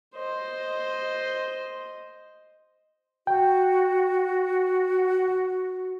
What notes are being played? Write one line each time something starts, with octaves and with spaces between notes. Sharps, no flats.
C5 D#5
F#4 G5